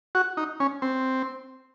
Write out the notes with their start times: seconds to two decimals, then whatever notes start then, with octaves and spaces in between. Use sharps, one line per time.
0.15 F#4
0.37 D#4
0.60 C#4
0.82 C4